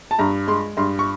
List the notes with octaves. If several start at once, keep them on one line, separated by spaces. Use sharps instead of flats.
A5
G2 A#5
G#3 C6
G2 C6
C#6